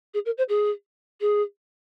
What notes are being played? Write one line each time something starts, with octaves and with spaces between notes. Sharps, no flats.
G#4
A#4
C5
G#4
G#4